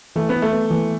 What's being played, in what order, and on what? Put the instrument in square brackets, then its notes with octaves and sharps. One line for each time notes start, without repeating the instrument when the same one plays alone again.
[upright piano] E3 [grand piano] A3
[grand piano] B3
[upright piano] E4
[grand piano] A3
[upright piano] B3
E3